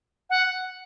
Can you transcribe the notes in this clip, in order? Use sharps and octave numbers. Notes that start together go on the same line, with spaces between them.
F#5